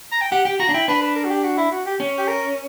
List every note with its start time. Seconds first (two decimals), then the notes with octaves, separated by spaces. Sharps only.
0.12 A#5
0.21 G5
0.32 G4 F#5
0.45 G4 G5
0.60 F#4 A#5
0.69 D4
0.74 E4 G5
0.88 D4 B4
1.01 B4
1.16 A#4
1.24 F#4
1.30 G4
1.44 F#4
1.57 E4
1.72 F#4
1.86 G4
2.00 C#4
2.18 G4
2.28 A#4